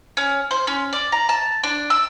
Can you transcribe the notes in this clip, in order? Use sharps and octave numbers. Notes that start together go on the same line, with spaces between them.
C#4
C5
C#4
D5
A#5
A5
D4
E6